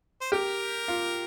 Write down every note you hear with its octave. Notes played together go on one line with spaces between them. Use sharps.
C5
G4 A#4
F4